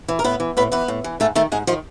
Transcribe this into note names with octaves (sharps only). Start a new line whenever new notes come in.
E3
A#4
A2 B3 B4
E3
A2 B3 B4
E3 B3 B4
A2
E3
G#2 A3 A4
D#3 A3 A4
G#2 G#3 G#4
D#3 F3 F4